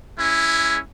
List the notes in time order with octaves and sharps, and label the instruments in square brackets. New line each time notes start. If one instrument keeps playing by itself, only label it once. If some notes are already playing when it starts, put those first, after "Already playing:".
[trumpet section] G#3 C#4 E4